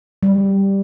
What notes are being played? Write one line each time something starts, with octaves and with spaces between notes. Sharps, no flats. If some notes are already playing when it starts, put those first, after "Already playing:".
G3